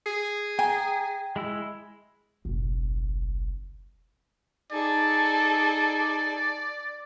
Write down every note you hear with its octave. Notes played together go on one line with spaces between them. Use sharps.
G#4
G5 G#5 A#5
G#3 E4 E6
F#1 B1
D#4 G#4 A4 D5